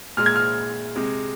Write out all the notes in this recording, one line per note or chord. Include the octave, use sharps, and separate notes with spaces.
A#2 G#3 F6
G#6
F6
C3 G#3